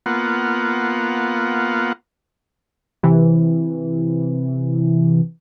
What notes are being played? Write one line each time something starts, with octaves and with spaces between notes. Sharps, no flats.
A#3 B3 F4 F#5
C3 E3